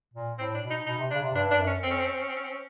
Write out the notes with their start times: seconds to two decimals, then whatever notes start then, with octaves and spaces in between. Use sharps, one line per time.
0.14 A#2
0.38 A2 C4
0.55 D4
0.62 B2
0.70 D#4
0.86 B2 D#4
0.99 C3
1.11 D4
1.14 C#3
1.23 C3
1.34 G2 D4
1.51 D4
1.54 G2
1.59 F#2
1.67 C#4
1.83 F2 C4
1.91 C#4
1.99 C4
2.06 C#4
2.14 C4
2.21 C#4
2.29 C4
2.36 C#4
2.44 C4
2.51 C#4